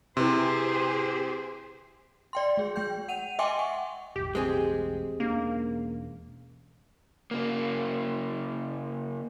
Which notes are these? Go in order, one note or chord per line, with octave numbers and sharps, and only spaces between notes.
C3 E4 G4 G#4 B4 C5 C6
D5 G5 C6
G#3 G#4
G#3 G5 G6
F#5 D#7 F7
D#5 E5 G5 G#5 C6 D6
F#5 C#6
E1 A1 G4
G#3 C4 G#4
E1 A#3 C#4 D4
C#3 A#3